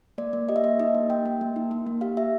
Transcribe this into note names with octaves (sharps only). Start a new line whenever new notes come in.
A#3 D5
A#3
G4 D#5
E5
A#3 D#5
D#4 D#5
A#3
A#3 G5
A#3
A#3
D#4
A#3
A#3
G4 F5
G4 E5